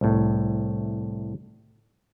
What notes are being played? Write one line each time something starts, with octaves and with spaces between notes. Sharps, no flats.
C2 A2